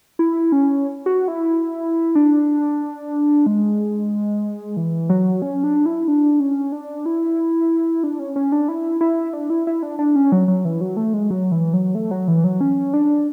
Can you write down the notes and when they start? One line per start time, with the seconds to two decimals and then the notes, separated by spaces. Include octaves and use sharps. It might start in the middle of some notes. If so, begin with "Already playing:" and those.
0.19 E4
0.52 C#4
1.06 F#4
1.28 E4
2.15 D4
3.46 G#3
4.77 E3
5.10 F#3
5.42 C#4
5.64 D4
5.86 E4
6.08 D4
6.40 C#4
6.72 D4
7.06 E4
8.04 D4
8.19 C#4
8.36 C#4
8.52 D4
8.68 E4
9.01 E4
9.33 D4
9.50 E4
9.67 E4
9.83 D4
9.99 D4
10.16 C#4
10.32 F#3
10.48 F#3
10.65 E3
10.81 F#3
10.97 A3
11.14 G#3
11.30 F#3
11.52 E3
11.74 F#3
11.95 A3
12.11 F#3
12.28 E3
12.44 F#3
12.61 C#4
12.94 D4